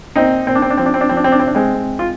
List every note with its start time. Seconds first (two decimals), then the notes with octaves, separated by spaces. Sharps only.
0.16 A#2 C4 D#4
0.47 A#2 C4
0.55 D4
0.62 C4
0.70 D4
0.77 F3 C4
0.86 D4
0.94 C4
1.01 D4
1.09 F3 C4
1.17 D4
1.24 C4
1.32 D4
1.39 C4
1.42 C3 D4
1.55 G#3 C4
1.74 G#3
1.99 F4